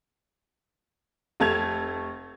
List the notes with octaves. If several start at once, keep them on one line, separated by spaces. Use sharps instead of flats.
F1 A3 A5 G#6 F7